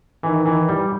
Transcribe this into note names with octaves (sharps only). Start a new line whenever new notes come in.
D#3 E3
E3
G3